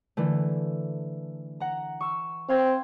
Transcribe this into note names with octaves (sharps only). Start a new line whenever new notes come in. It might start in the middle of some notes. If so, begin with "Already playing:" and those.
D3 E3 A3
F#5 A#5
C#6 E6
C4 F5 C6 G#6